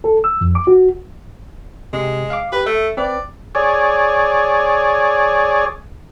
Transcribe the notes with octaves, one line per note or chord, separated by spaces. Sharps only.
A4
E6
F2
D6
F#4
C3 G#3
F5 D6
G4 B4
A3 E5
C4 B4 D5
G#4 C#5 D5